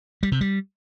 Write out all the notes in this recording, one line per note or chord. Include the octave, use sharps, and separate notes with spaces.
G3
C3
G3